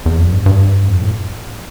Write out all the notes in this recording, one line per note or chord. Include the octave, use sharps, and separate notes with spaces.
E2
F2
G2
G2
F2
A2